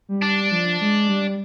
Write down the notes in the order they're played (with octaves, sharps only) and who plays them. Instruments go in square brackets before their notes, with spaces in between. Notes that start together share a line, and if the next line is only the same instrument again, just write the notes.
[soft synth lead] G3
[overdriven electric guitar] D4
[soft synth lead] F3
G#3
G3